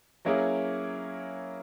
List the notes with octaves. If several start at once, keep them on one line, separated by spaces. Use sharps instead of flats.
F#3 A#3 C#4 E4 G#4